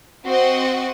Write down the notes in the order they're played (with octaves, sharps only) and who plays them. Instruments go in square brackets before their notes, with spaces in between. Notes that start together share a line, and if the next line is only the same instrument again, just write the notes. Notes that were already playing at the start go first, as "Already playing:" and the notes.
[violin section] C4 F#4 C5 D#5 F#5